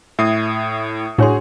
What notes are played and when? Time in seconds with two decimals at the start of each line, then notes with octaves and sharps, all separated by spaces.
0.19 A2 E5 D#6 C7
1.18 A2 D4 F#4 G#4 C#5 C6